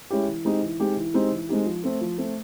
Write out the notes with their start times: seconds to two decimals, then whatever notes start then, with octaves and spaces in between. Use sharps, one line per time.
0.10 G#3 C#4 E4 G4
0.28 E3
0.45 G#3 C4 D#4 G4
0.62 E3
0.80 G#3 C4 D#4 G4
0.96 E3
1.14 G#3 C4 D#4 G4
1.32 E3
1.49 G#3 C4 D#4 G4
1.66 F3
1.83 A3 C4
2.01 F3
2.18 A3 C4